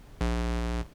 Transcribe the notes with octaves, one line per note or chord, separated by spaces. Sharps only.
A#1